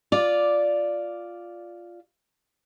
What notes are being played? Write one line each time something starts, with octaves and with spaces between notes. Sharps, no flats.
F4 D5